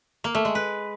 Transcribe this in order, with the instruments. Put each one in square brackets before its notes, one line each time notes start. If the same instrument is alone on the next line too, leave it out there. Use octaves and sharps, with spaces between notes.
[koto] A#3
A3
G#3
B4